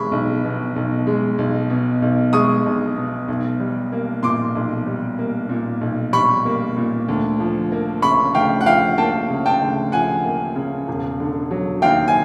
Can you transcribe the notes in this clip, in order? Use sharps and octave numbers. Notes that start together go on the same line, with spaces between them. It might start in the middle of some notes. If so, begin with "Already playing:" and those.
Already playing: B1 G#3 B5 C#6
B1
B2
B1
G#3
B1
B2
B1
G#3 C#6 D#6
B1
B2
B1
G3
A#3
A#2 C6 D6
B1
G3
A#3
A#2
B1
G3 B5 C#6
A#3
A#2
D2
F3
A#3
C#3 B5 C#6
D2 F5 G5
F#5
F3 F5 G5
A#3 G5 A5
C#3
G5 A5
D2
F3 F#5 G#5
A#3
C#3
E1
D3
F#3
D#2 F5 G5
G#5